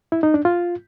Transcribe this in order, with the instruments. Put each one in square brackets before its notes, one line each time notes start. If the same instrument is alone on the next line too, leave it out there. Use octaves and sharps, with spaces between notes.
[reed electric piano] E4
D#4
D4
F4